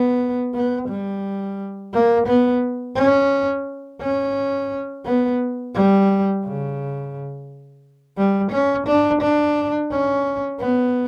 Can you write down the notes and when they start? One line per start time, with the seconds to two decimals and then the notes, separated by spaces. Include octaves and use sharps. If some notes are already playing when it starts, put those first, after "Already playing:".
Already playing: B3
0.54 B3
0.88 G3
1.93 A#3
2.27 B3
2.96 C#4
4.01 C#4
5.05 B3
5.74 G3
6.43 C#3
8.17 G3
8.51 C#4
8.87 D4
9.21 D4
9.91 C#4
10.59 B3